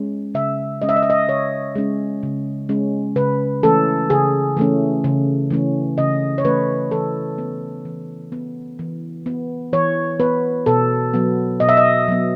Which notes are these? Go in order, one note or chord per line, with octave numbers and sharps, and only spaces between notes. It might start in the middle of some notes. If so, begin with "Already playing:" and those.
Already playing: G#3 C#4
C#3 E5
G#3 C#4 D#5
E5
D#5
E5
D#5
C#3 C#5
G#3 C#4
C#3
G#3 C#4
C#3 B4
E3 A3 C#4 A4
C#3 G#4
E3 A3 C#4
C#3
E3 A3 C#4
C#3 D#5
C#5
E3 A3 C#4 B4
E3 A4
B3
E3
B3
E3
B3
E3 C#5
B3 B4
B2 A4
F#3 B3
B2 D#5
E5
D#5
F#3 B3